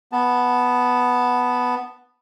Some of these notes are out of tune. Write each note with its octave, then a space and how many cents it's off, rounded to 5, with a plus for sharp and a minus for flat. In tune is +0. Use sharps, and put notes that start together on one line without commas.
B3 +0 A5 +0